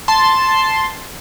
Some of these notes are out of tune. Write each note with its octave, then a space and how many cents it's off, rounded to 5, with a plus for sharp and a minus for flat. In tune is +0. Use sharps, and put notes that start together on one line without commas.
A5 -5 C6 +0